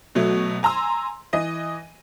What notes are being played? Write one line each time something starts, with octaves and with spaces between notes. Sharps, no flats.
B2 F#3 A3
G#5 A#5 C6 E6
E3 D#5 D#7